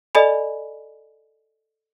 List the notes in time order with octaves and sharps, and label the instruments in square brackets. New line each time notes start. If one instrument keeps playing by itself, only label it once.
[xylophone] A4 D5 D#5 G#5 B5